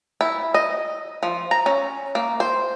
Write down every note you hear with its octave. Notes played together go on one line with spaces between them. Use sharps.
E4
D#5
F3
A#5
C#4
A#3
C5